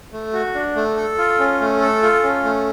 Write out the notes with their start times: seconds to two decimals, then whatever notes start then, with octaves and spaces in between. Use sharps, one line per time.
0.13 A3
0.33 F#4
0.54 D4
0.75 A3
0.96 A4
1.18 F4
1.39 C#4
1.60 A3
1.81 A4
2.03 F4
2.24 C#4
2.44 A3